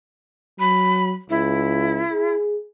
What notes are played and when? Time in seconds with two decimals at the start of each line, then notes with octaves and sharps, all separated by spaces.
0.60 F#3 B5
1.30 C#2 E4
2.12 G#4